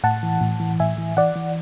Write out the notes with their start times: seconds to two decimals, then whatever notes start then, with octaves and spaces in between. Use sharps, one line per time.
0.03 A2 F#5 A5
0.23 E3
0.41 A2
0.60 E3
0.80 A2 E5 G#5
0.98 E3
1.17 E3 D5 F#5
1.36 E3